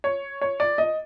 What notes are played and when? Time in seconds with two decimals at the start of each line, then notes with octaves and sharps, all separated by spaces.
0.04 C#5
0.41 C#5
0.60 D5
0.78 D#5